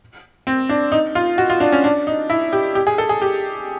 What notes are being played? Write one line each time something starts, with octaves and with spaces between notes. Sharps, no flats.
C4
D4
D#4
F4
F#4
F4
D4
C#4
D4
D#4
E4
G4
G4
G#4
A4
G#4
G4